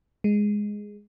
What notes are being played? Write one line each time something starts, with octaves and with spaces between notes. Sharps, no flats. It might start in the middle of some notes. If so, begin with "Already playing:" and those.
G#3